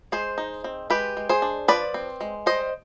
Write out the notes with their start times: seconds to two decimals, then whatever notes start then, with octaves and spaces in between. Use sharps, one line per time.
0.12 G#3 G#4 C5
0.38 D#4
0.64 C4
0.90 G#3 G4 B4
1.17 G#3
1.29 G#4 C5
1.42 D4
1.68 F3 B4 D5
1.94 C4
2.21 G#3
2.46 G3 C5 D#5